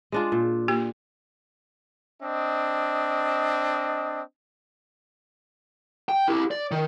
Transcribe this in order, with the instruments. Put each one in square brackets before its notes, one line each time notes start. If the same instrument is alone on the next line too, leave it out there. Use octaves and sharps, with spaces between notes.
[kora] G#3 D4 F4
A#2
[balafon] A#3 G4
[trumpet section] C4 D4 D#5
[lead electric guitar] G5
E4 G4
D5
D#3